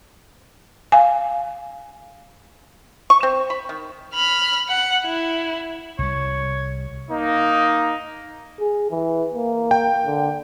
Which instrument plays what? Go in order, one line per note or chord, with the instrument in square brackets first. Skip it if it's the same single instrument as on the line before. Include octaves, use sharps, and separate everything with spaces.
[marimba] F5 G#5
[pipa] C#6
C4
B5
D#3
[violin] B5 F6
F#5
E4
[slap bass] C2 G3 [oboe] C#5
[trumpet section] A#3 D#4
[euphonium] G#4
E3
A#3
[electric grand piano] G5
[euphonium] D3